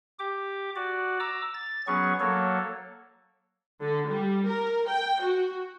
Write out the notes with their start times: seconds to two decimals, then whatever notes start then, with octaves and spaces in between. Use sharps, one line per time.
0.19 G4 D6
0.76 F#4 D5
1.20 A#5 D6 E6
1.54 A6
1.87 F#3 B3 C#4 G#4 C#6
2.20 F#3 A#3 A4 C#5
3.82 D3
4.10 G3
4.47 A#4
4.88 G5
5.22 F#4